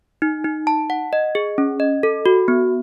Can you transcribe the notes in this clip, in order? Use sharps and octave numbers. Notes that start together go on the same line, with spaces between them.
D#4
D#4
A5
F#5
D#5
G#4
C#4
D#5
A4
F#4
B3